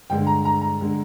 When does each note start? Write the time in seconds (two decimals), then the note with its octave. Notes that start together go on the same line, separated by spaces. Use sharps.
0.10 G2 D3 G#3 G5
0.27 A#5
0.45 A#5
0.61 A#5
0.81 D3 G#3